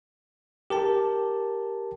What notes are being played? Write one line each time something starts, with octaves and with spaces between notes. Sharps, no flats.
G4 A#4 A5